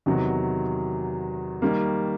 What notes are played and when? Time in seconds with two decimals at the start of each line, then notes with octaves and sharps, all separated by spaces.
0.06 E2 C3 D#3 F#3
1.62 D#3 G3 A#3